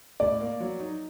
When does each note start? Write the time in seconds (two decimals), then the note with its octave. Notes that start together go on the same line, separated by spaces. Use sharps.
0.20 A2 D5
0.41 A#3
0.60 F#3
0.80 D#4